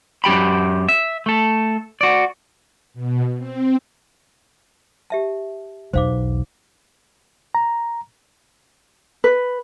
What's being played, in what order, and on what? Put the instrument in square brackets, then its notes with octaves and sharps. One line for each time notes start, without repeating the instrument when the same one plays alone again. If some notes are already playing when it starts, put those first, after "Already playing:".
[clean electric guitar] F#2 G4 G5 B5
E5
A3 A4
F#4 D5
[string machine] B2
C4
[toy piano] G4 E5 A5
[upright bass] B1 E2 [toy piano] C5 F5 D6
[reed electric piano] A#5
[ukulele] B4